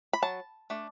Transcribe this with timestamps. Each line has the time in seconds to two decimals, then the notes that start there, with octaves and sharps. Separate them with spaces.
0.13 B5
0.22 F#3 A5
0.70 A3 D4